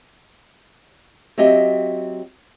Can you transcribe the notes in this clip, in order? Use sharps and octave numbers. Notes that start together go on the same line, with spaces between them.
F#3 C4 G4 D#5 E5